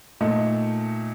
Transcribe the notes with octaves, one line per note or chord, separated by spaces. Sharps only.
A#2 A3 D#4